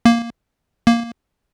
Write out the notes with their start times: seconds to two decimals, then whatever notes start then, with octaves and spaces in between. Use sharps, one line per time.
0.05 A#3
0.87 A#3